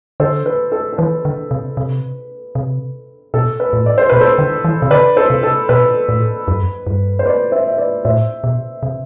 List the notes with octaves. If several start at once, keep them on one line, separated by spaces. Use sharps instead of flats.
D3 A4 C5
B4
A4
A4
E3 B4
D3
C3
C3
C3
B2 A4
B4
A2
D5
C5
B2 B4
A4 C5
D3
E3
C3
D3 B4 D5
A4 C5
C3
A4
B2 B4
A2
F#2
G2
C5
B4 D5
C5 E5
E5
B4 D5
A2 C5 E5
B2
C3